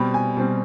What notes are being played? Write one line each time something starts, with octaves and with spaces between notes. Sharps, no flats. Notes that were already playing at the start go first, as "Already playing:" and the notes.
Already playing: B2 G3 C4 B5
G#5
B2 G3 C4